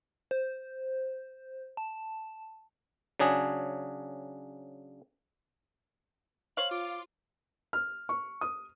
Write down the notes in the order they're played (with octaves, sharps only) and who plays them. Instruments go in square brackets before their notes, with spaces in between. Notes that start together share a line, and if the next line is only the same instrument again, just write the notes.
[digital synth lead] C5
A5
[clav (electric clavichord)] C#3 F#3 D4 G#4
[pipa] C5 C#5 F5 [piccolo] F#7
[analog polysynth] F4 [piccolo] D6
[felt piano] F6
C#6
D#6